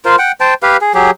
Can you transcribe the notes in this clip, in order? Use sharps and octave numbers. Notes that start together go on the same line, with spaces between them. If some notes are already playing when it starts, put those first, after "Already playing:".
F4 A#4 C5
F#5 G5
C5 G5 A5
G4 B4 F5
G#4
F#3 G4 G#4